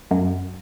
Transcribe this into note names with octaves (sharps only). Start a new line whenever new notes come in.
F#2